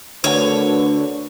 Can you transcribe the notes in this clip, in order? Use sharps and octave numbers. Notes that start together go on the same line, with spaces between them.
D2 D3 F#4 A#4 B4 C#5